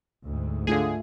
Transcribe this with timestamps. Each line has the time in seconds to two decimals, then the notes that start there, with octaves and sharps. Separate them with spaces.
0.25 D2 G#2
0.67 D3 A3 F4 G#4